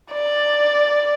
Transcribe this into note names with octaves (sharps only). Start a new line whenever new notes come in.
D5